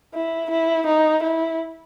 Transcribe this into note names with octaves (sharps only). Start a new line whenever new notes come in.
E4
E4
D#4
E4